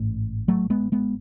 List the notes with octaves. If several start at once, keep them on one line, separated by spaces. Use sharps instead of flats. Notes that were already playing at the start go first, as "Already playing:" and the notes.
Already playing: A1 G#2 A3
F#3 A3
G#3 B3
G#3 B3